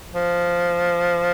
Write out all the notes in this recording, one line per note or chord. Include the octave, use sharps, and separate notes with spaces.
F3